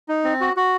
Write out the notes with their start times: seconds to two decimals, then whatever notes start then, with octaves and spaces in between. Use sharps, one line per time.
0.08 D#4
0.24 C4
0.41 F#4
0.57 F#4